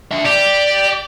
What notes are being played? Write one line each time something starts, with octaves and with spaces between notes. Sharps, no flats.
D4 E5
G4 D5